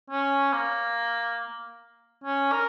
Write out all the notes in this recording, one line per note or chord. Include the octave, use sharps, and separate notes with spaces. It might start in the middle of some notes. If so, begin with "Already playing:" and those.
C#4
A#3
C#4
A#4